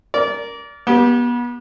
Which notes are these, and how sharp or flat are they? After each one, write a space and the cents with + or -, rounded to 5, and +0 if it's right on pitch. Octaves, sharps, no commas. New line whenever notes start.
A#4 +0 D5 -25
B3 -35 G4 +0